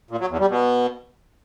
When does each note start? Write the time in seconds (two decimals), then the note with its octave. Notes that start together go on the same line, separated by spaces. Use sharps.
0.11 A#2
0.20 F#3
0.30 E2
0.40 G3
0.49 B2